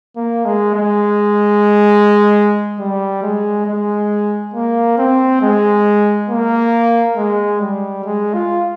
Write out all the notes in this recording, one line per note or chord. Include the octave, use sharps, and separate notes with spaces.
A#3
G#3
G#3
G3
G#3
G#3
A#3
C4
G#3
A#3
G#3
G3
G#3
F4